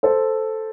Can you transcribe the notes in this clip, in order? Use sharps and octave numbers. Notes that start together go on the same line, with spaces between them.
A4 C5